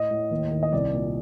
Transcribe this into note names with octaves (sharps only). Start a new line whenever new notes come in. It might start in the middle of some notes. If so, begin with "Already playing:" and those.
Already playing: A2 D#5
A2
D#2
D#3
D#5
C2 D5
A#2